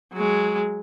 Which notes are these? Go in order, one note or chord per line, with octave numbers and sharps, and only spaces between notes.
F#3 G#3